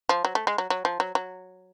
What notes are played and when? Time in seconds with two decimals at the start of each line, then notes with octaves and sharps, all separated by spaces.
0.09 F3
0.25 F#3
0.35 A3
0.47 G#3
0.58 F#3
0.70 F#3
0.85 F3
1.00 F#3
1.15 F#3